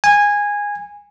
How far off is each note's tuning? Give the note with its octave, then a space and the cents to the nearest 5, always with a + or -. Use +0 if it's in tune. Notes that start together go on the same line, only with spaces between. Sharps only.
G#5 -15